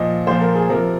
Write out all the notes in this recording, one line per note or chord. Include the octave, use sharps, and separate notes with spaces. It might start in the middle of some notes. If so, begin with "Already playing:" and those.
Already playing: A#2 F3 D#5
A#2 F3 C5
A#4
G#4
C3 F3 A#4